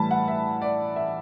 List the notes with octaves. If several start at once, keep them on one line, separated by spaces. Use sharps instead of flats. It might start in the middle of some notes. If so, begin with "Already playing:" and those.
Already playing: A2 E3 G3 A5 B5
F#5
E5
D5
E5